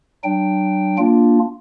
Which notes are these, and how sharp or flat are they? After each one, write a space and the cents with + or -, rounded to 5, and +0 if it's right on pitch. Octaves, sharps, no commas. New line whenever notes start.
F#3 +40 D4 +30 G5 +0
A#3 +0 D4 -10 F4 +0